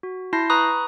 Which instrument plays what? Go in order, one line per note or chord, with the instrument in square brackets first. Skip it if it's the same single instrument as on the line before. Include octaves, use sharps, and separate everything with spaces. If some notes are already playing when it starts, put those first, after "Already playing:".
[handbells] F#4
E4 A5 C6 G6 A#6 C7
B4 A#5 B5 C#6 D#6 F#6